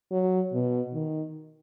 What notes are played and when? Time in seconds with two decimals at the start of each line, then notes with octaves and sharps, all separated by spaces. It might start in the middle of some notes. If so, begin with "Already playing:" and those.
0.11 F#3
0.53 B2
0.94 D#3